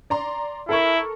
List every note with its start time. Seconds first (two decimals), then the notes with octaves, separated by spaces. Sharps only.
0.10 D5 A#5 C6
0.69 E4 A4 A#4 C#6